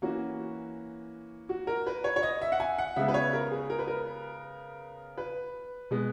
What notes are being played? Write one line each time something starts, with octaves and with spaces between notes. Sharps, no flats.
E3 A#3 C#4 F#4
F#4
A#4
B4
C#5
C#5
D#5
E5
F#5
G#5
F#5
C#3 G#3 B3 E5
B4
C#5
A#4
G#4
A#4
B4
A#4
B4
B2 G#3 B3